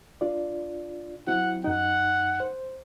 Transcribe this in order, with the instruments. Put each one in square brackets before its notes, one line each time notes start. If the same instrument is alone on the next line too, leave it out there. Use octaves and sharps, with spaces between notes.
[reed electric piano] D4 F4 D5
[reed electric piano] F#3 C4 E4 [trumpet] F#5
[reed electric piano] F#2 D#4 [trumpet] F#5
[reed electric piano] C5